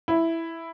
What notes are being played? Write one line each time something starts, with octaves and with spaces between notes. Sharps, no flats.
E4